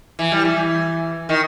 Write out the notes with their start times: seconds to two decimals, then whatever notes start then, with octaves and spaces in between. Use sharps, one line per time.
0.19 E3
0.32 G3
0.45 E3
1.29 D#3